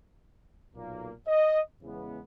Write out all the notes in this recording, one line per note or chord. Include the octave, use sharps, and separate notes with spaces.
B1 A#2 A#3
D#5
E2 C#3 E3 G#3 B3